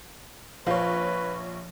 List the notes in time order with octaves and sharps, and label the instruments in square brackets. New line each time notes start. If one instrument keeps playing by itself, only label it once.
[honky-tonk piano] A#1 C#5 [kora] F3 [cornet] B4